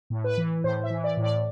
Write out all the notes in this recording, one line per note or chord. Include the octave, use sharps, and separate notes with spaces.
A2
B4
E3
A2 C5
E5
E3
D5
A2
D5